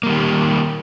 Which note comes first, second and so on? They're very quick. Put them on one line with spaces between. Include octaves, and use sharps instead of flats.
A#3 G3 D#3 G4